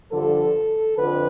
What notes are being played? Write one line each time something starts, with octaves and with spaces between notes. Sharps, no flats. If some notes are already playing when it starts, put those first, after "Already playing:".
G2 D3 F3 A4
F2 D3 F3 B4